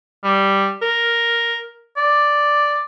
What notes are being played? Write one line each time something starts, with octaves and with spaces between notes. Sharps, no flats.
G3
A#4
D5